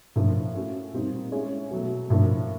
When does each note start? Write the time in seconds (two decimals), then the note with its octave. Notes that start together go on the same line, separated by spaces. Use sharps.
0.16 A2 F3 A#3 D4 F4
0.54 A3 C#4 F#4
0.93 A#2 G3 C4 D#4
1.32 G#3 C#4 E4 G#4 C#5
1.71 B2 F#3 A3
2.10 A2 F3 A#3 D4